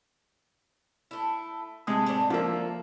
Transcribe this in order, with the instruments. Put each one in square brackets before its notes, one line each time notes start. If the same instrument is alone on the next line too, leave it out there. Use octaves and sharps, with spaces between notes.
[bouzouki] A3 E4
[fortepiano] C3 G#3 D#6 [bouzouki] A3
[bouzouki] A2 D4 C5
[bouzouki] D3 E5 [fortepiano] F3 A#3